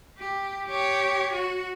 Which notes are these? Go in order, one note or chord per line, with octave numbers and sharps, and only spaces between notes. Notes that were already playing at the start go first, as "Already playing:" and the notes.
G4
G4 C#5
F#4